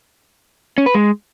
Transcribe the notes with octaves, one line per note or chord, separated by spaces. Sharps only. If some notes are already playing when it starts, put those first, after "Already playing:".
C#4
B4
G#3